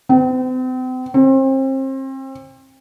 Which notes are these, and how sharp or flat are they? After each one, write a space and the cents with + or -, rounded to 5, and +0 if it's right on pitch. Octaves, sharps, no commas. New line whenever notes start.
C4 -40
C4 +35